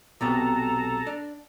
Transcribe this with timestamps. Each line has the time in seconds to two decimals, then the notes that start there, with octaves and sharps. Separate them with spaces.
0.21 B1 C3 B3 A4 A5 A#5
1.07 D4